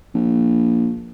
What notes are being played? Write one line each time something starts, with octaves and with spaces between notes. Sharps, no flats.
A#1